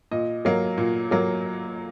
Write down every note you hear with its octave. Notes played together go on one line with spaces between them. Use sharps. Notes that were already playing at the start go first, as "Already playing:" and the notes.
A#2 D#5
F#3 A#3
A#2
F#3 A#3